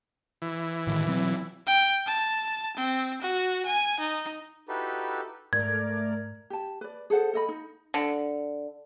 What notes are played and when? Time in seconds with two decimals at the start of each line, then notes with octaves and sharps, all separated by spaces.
0.42 E3
0.87 A2 D#3
1.06 B2 F#3 C4
1.66 G5
2.06 A5
2.77 C4
3.22 F#4
3.65 G#5
3.99 D#4
4.68 D#4 E4 F#4 G4 A4 B4
5.53 G#2 A3 A#4 D5 G#6
6.50 G4 A5
6.81 B4 D5
7.10 G#4 A4 C5 F#5
7.33 A4 D#5 B5
7.49 D#4
7.94 D3